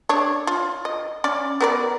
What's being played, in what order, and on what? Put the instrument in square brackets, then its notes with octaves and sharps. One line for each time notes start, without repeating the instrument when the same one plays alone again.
[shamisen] D4 C#5
F4
D#5
C#4 D5
B3 A#4 D5